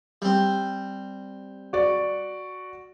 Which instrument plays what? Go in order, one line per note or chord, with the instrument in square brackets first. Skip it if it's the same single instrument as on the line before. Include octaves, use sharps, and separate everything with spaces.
[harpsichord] G3 C4
[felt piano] F#4 D5